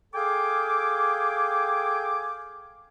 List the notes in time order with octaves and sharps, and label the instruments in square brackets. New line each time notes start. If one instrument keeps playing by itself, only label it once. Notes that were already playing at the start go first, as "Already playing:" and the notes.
[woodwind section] G#4 A4 F5 G5 G#5 D6